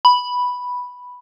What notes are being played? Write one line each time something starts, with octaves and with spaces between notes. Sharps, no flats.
B5